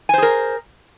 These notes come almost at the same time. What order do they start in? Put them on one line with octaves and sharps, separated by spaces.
G#5 C5 G#4 A#4